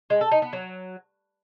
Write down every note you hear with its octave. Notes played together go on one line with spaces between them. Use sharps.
G#3
A4
D#4
B3
F#3